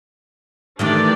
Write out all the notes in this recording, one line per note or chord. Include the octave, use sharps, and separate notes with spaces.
D#3 E3 A3 D4 G4 D5